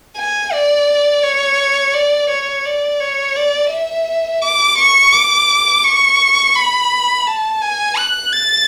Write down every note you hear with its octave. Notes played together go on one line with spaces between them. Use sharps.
G#5
D5
C#5
D5
C#5
D5
C#5
D5
E5
D6
C#6
D6
C#6
B5
A5
G#5
F#6
A6